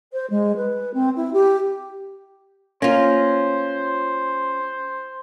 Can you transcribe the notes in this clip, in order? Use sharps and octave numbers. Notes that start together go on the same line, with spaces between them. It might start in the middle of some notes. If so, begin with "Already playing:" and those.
C5
G#3
B4
C4
E4
G4
A#3 C#4 F4 C5